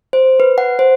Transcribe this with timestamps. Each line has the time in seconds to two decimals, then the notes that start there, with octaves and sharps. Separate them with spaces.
0.13 C5
0.40 B4
0.58 F#5
0.79 C5